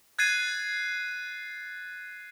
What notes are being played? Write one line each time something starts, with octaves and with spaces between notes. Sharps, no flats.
F#6 G#6 A6 C7 D#7